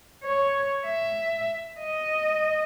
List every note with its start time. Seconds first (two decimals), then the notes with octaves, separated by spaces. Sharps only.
0.23 C#5
0.86 E5
1.81 D#5